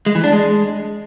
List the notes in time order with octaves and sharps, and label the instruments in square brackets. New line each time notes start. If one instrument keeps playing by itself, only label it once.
[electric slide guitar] G#3
E3
D4
G#3